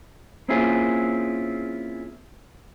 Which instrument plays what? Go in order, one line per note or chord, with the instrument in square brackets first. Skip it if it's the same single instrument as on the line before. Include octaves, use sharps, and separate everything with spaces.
[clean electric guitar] A#3 C4 C#4 E4 F4 G#4